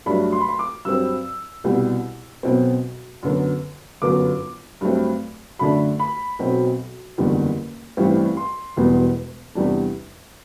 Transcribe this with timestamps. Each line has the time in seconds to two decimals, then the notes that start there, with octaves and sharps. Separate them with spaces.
0.06 G2 F#3 A3 D4 B5
0.32 C6
0.41 B5
0.49 C6
0.59 D6
0.85 G2 F#3 C4 E6
1.64 C2 B2 G3
2.43 B1 B2 F#3 C4
3.23 F#2 D3 F#3 B3
4.02 G1 F#2 F#3 B3 D6
4.81 G2 F#3 A3 C4
5.59 F#2 D3 A3 D4 B5
5.99 B5
6.39 B1 B2 F#3 C4
7.18 F#1 E2 D3 G3
7.97 A1 G2 E3 G3 C4
8.37 C6
8.76 E1 E2 B2 G3 B3
9.55 E2 C3 G3 D4